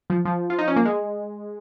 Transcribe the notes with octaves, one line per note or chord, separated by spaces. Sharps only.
F3
F3
F4
D#4
C#4
A#3
G#3